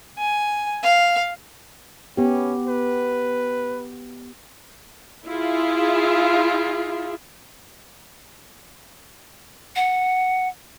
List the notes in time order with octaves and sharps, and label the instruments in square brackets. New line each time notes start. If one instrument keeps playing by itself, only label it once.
[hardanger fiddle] G#5
F5
[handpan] B3 G4 [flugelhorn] C#4
[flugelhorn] B4
[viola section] E4 F4 G#4
[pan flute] F#5